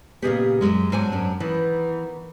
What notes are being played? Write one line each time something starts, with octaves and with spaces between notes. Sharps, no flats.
A#2 C#3 B3 G4 G#4 D#5
F#2 G#3
G#2 F#3 C4 D4 G#5
F#2 C#4
D#3 E3 B3 B4